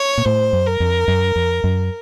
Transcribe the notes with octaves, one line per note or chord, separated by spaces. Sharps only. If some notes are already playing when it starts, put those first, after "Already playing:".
Already playing: C#5
A#2
A2 C5
F#2
A#4
F2
F#2
F2
F#2